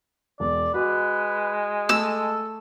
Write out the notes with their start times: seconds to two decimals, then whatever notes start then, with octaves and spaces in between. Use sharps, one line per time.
0.40 E1 D5
0.74 G#3 F#4 B4
1.89 A3 A4 E6